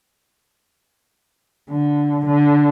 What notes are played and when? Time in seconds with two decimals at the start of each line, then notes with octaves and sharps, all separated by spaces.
1.70 D3
2.26 D3